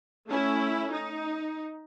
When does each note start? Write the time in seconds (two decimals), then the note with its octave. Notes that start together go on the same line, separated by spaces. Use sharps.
0.26 A3 C#4 E4
0.92 D#4